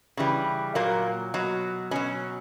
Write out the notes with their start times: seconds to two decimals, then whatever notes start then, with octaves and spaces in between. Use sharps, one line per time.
0.17 C#3 E3 G3
0.75 A#2 F#3 A#3
1.34 B2 F#3
1.91 B2 F#3 C#4